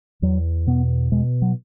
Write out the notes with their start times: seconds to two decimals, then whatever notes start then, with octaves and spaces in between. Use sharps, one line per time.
0.22 E2 F#3
0.67 B2 B3
1.12 B2 G#3
1.42 F#3